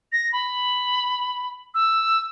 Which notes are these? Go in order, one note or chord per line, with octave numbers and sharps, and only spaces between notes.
A#6
B5
E6